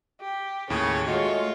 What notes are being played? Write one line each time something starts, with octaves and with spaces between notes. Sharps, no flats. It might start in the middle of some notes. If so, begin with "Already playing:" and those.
G4
D#2 A2 C#3 C#5
G#3 A3 F4 F#4 D#5